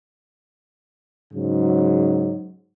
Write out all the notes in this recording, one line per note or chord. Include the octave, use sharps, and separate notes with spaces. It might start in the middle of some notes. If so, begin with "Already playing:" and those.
G#2 C#3 F#3